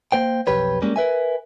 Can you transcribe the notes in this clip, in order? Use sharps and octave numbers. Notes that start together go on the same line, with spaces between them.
A#3 C5 G5
B1 F2 G4 B4 C#5
G3 G#3 A#3 C#4
A#4 B4 E5 G#5